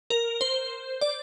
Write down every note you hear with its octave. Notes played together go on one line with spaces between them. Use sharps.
A#4
C5
D5